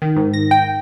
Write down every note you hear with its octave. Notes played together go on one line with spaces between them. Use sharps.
D#3
G#2
A#6
G5